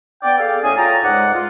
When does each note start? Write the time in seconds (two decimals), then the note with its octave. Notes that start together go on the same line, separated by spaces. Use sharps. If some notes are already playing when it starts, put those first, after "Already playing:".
0.23 B3 D5 G5
0.39 G#4 A4 F5
0.63 A2 A3 C#4 G#4 D#5 G#5
0.78 F4 C#5 G5 A5 A#5
1.03 C#2 G#2 G#3 D5 F#5
1.34 F4